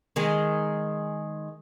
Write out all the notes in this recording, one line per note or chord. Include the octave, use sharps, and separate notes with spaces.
D#3 G#3 G#4